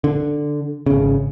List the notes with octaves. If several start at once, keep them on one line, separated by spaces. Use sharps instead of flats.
D3
G#1 C#3